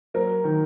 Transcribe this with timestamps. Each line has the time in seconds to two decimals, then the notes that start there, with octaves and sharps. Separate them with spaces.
0.14 F#3 A#4
0.44 D#3